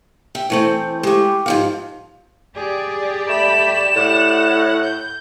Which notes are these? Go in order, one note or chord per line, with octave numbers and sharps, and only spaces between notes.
G4 E5
E3 A3 C4 C5
G#3 A3 G4
G#2 F3 F5
G4 G#4 D5
A3 B5 E7
A2 F#5
G6